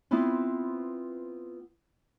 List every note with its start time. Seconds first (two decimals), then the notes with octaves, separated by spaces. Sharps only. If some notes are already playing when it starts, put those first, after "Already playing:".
0.11 B3 C4 E4 F4 B4 C5